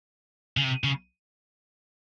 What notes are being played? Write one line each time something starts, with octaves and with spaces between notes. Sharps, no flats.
C#3
C3
C#3